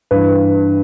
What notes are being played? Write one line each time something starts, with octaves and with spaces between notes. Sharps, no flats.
G2 E3 B4